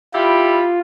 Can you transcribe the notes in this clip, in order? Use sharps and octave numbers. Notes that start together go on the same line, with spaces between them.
G3 E4 F4 G4